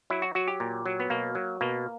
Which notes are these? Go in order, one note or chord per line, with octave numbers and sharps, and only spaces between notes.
F#3 E4
F#4
F#3 F#4
G4
A#2
F#3
B3
B2 A#3
F#3
B2 A#3